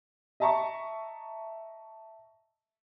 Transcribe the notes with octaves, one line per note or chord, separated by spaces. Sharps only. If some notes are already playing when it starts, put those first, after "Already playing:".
D#5 E5 A5 A#5 C#6